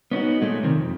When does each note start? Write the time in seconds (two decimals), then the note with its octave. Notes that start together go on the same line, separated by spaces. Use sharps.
0.11 B3 C#4 D#4 F#4
0.41 A#2 G#3 A3
0.63 C3 D#3
0.75 F2